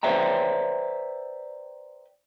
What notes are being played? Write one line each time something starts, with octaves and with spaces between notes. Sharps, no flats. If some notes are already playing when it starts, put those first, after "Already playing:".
B4 C5 D5 E5 G5 A#5